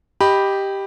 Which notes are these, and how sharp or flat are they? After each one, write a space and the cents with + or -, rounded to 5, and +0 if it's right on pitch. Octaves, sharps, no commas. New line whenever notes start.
G4 +0 D#5 +0 B5 -5